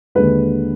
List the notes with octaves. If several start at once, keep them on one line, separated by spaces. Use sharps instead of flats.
D#2 D3 G#3 B4